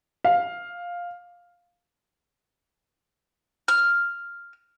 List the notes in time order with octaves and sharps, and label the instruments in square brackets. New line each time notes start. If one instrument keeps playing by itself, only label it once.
[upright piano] F5
[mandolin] F6